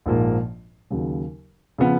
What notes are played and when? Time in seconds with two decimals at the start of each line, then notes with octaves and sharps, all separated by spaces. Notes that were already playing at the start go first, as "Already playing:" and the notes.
0.06 A#1 G#2 F3 A#3
0.90 D#2 C#3 F#3
1.78 C#3 F3 B3